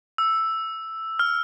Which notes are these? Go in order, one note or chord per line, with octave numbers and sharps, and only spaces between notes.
E6
F6